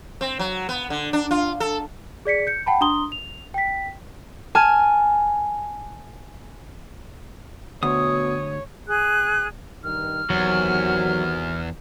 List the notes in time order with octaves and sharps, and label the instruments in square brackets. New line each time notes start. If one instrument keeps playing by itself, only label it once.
[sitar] C4
F#3
B3
D3
D4
F4
A4
[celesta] G#4 D5 B6 C#7
G6 C#7
F#5 G5 A5 B5
D4 A#5 C6 D#6 G7
F7
G5 B6
[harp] G#5 A5 F6
[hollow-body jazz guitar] D2 [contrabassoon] B2 [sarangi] C#5 [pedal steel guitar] D#6
[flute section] G#4 F#6
[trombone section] G2 D#3 [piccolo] F6
[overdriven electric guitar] E2 [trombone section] C3 D#3 F#4 [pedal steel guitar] F#3